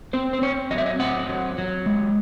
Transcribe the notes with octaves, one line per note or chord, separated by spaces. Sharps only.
C4 C5
C5
C4 C#5
F#3 D#5
E5
D#5
C4 F#5
F#3
F#3
G#3